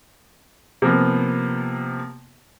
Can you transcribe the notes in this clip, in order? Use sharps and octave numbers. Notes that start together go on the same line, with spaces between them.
C3 F3 A#3 B3